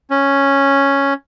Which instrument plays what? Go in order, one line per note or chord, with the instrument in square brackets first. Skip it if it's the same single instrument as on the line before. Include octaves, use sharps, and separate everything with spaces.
[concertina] C#4